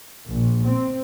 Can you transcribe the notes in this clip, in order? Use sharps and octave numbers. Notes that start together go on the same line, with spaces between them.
A#1
C4